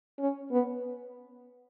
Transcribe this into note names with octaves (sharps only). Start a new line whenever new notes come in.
C#4
B3